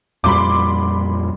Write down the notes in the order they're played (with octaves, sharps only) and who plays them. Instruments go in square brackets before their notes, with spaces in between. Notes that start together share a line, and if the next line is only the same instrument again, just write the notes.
[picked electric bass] F2 A#2 G3 [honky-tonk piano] B5 C6 D6